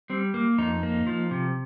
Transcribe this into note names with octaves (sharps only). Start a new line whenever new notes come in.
G3 C4
A#3
F2 D#4
A#3
F3
C3